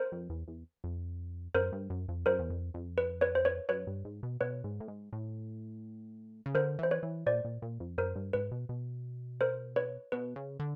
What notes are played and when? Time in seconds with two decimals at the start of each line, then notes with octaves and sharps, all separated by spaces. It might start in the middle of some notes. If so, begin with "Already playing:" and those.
Already playing: A#4 C5
0.12 F2
0.30 E2
0.48 E2
0.84 F2
1.54 F#2 A#4 C5
1.72 G2
1.90 F#2
2.08 F2
2.26 F#2 A#4 C5
2.39 E2
2.50 F2
2.74 F2
2.98 B4
3.21 B4 C#5
3.35 C5
3.45 B4 C#5
3.69 F#2 B4 C#5
3.87 G2
4.05 G#2
4.23 B2
4.41 B2 B4 C#5
4.64 G#2
4.80 A2
4.88 G#2
5.13 A2
6.46 C#3
6.55 D3 A#4 C5
6.79 E3 C5
6.91 B4 C#5
7.03 E3
7.26 A#2 C5 D5
7.45 A#2
7.62 A#2
7.80 F2
7.98 F#2 A#4 C5
8.16 G2
8.33 G#2 B4
8.52 B2
8.69 B2
9.41 A#4 C5
9.76 B4 C#5
10.12 B2 B4
10.36 C#3
10.60 D3